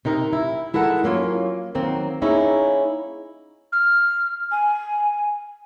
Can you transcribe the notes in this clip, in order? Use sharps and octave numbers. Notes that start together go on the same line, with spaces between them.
C3 D#4 A#4 D#5
E4
G#3 E4 A4 A#4 F#5
F#3 A#3 C#4 F4
D#3 F#3 A#3 C4
A#3 C#4 D#4 E4 G#4 C#5
F6
G#5